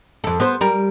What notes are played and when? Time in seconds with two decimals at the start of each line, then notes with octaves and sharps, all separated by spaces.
0.24 F2 A4
0.40 B3 C5
0.61 G3 A#4